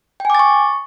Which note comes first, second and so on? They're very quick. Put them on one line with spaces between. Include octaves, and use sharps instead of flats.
G5 G#5 D6 A6 C#6